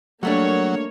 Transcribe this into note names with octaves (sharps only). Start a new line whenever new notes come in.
F#3 G3 A3 A#3 D4 C#5